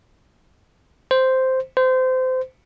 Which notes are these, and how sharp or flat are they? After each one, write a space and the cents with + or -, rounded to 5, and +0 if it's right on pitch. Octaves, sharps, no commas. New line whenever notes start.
C5 -5
C5 -25